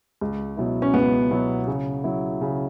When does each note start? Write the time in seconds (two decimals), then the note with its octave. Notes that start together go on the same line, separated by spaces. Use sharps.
0.21 C#2
0.57 B2 F#3 E4
0.82 C#4
0.94 C#2 B3
1.31 B2 F#3 E4
1.67 C#3
2.04 F#3 E4
2.41 C#3